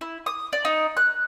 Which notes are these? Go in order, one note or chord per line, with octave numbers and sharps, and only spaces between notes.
E4
D#6
D5
D#4
F#6